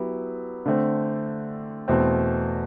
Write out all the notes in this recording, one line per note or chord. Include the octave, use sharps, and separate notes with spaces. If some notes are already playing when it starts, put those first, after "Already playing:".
Already playing: F#3 B3 E4 G4
D3 A3 C4
E2 B2 A3 C4